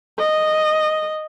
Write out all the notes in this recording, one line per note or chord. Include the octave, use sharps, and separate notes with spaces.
D#5